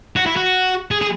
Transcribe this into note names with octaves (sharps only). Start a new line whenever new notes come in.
F#4
E4
F#4
G#4
G#4